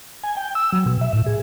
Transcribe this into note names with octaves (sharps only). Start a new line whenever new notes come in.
G#5
G5
E6
F#3
B2
E5
A2
G#4